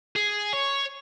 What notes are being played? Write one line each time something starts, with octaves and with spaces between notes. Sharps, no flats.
G#4
C#5